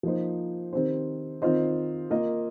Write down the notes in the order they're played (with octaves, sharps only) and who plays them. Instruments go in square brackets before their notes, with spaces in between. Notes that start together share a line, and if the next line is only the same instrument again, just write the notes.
[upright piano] F3 A#3 D#4 C5
D#3 C4 G4 C5
D#3 C4 F4 C5 D#5
A#3 F4 A#4 D#5